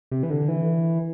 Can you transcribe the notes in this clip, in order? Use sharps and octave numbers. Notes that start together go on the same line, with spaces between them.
C3
E3
D3
E3